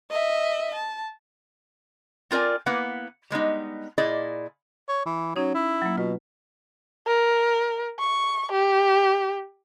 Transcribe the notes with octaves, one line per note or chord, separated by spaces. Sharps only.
D#5 E5
A5
C4 F4 A#4 D5 G#5
A#3 B3 E4 B4 F#5
G3 G#3 B3 D#4
A#2 E4 G#4 D5 D#5
C#5
E3
F#3 C#4 D#4 G#6
E4
F#3 A#3
B2 F4 B4
A#4
C#6
G4